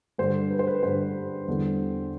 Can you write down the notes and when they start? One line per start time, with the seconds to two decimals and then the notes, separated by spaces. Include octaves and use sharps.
0.18 G2 D3 G3 C5
0.51 B4
0.59 C5
0.67 B4
0.83 G2 D3 G3 C5
1.48 E2 D3 G3